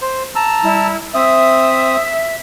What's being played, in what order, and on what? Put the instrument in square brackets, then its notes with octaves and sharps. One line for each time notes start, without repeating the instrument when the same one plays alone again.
[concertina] C5
A5 A#5 E6
[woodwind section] G3 E4
[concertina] C4 D#6 [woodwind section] E5